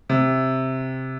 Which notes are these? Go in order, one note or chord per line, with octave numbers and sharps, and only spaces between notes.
C3